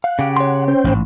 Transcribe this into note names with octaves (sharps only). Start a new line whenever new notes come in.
F5 F#5
C#3 G4
C#5 C6
C#4 C5 G5
A1 G#2